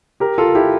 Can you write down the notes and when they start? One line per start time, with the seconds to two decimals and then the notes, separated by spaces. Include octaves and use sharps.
0.20 G4 A#4
0.38 F4 A4
0.55 E4 G4